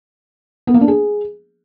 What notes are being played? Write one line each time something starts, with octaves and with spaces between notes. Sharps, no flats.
B3
A#3
D4
G#4